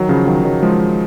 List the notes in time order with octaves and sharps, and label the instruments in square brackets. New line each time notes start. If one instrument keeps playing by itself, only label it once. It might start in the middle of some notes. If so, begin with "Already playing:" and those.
Already playing: [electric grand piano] D#3 F#3
C#3 F3
D#3 F#3
D#3 F#3
F3 G#3